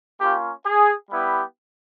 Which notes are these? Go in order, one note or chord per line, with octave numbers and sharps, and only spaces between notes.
A#3 C#4 F4 G4
G#4
G3 B3 E4 G4